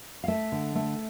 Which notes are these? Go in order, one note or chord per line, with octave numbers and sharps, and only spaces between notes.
F5
A3 E5
D3
A3